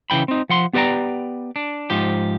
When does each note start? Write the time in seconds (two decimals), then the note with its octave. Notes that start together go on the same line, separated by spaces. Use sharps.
0.10 C#3 E3 G5 B5
0.28 C4 D#4
0.49 F3 F#5 C6
0.73 B3 G4 B4 D5 G5 A#5
1.56 D4
1.90 G#2 F3 G4